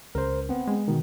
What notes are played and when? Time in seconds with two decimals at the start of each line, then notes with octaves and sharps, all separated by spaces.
0.15 C#2 A#4 C5
0.49 B3 C4
0.67 G#3
0.88 B2 D#3